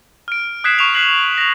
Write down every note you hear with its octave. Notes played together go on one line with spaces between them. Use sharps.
F6 D7
D#6 F#6 G#6 B6 C7 E7
C#6 E7 F7
F#6 B6 C7 F#7
A#6 F7